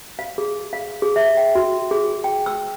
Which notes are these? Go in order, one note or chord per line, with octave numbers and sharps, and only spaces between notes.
F5
G#4
F5
G#4
E5
G5
F#4
G#4
G5
E6